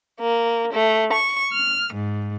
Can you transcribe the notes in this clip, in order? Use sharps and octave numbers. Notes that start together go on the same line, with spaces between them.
A#3
A3
C#6
F6
G#2